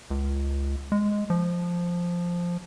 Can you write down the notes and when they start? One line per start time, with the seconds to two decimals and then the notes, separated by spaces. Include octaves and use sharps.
0.10 C#2
0.92 G#3
1.30 F3